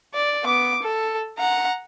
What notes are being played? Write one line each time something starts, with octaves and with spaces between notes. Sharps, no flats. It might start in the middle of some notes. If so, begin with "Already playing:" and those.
D5
B3 D6
A4
F#5 A#5